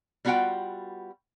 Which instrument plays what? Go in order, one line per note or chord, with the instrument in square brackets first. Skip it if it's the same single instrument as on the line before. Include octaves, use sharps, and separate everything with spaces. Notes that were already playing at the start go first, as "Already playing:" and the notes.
[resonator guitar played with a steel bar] G3 B3 F4 F#4 F#5 G5